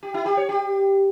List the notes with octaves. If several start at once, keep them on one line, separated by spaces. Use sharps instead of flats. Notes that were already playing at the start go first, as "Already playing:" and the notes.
G4
E4
G4
C#5
G4